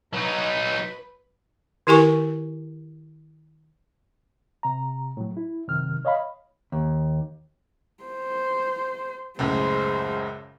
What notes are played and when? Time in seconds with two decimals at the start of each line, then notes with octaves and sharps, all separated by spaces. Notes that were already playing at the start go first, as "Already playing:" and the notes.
0.14 F#3 D#4 B4
1.87 D#3 E4 G4 A#4 G#5 C#6
4.63 C3 A#5
5.17 A2 F#3
5.37 E4
5.68 F#2 C3 D#3 F6
6.05 C#5 D#5 F5 B5
6.72 D#2
8.04 C5
9.39 C#2 F#2 A2 G#3 C5